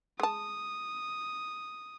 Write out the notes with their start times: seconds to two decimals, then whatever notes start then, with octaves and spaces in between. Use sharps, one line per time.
0.20 G#3 A5 D#6